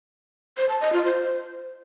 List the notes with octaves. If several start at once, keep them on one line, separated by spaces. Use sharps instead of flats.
C5
A5
D#5
F4
C5